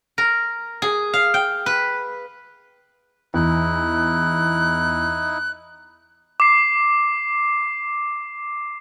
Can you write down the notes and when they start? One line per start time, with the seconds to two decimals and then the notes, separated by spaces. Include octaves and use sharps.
0.18 A#4
0.82 G#4
1.13 F5
1.34 G5
1.66 B4
3.34 E2 D#4 E4 F#6
6.40 D6 C7